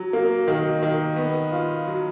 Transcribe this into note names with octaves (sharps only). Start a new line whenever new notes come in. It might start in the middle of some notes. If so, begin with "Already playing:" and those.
Already playing: F#3
A#3
D#3
D#3
B3
F4
F#3